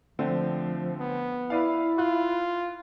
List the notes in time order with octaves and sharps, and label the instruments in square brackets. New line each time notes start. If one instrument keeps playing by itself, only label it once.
[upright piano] D3 A3 C4 [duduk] F3
[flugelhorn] B3
[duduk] E4 [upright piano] B4 D5 F5
[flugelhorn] F4 [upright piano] F#6